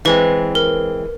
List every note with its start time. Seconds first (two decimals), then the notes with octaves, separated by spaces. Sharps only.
0.05 E3 G#3 C4 B4
0.55 A#4